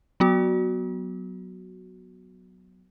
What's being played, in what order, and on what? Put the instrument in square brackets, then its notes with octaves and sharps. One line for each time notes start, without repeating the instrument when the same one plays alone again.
[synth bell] F#3 B3 F#4